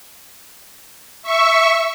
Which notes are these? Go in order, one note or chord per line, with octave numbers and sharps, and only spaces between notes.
E5 C#6